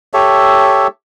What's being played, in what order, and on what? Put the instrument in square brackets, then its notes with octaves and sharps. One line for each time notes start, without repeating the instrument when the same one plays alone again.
[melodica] G4 A4 C#5 E5